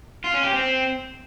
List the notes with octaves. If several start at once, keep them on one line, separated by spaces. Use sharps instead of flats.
F4
C#4
G4
C4